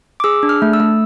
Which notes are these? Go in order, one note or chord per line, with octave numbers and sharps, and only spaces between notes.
D6
G#4 E6
D4
F6
A3
E6
A3